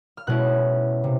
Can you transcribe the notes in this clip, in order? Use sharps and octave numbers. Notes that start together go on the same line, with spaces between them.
F6
B2 G#3 C#4 E4 F#6
C3